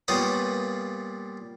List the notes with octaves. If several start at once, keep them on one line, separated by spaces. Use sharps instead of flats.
A#2 G3 B3 C#5 F5 D#6